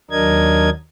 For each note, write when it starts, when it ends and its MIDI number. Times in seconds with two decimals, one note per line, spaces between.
0.11 0.70 39
0.11 0.70 54
0.11 0.70 62
0.11 0.70 70
0.11 0.70 75
0.11 0.70 92